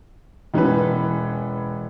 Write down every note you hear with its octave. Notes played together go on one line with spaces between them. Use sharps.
E1 E3 C#4 B4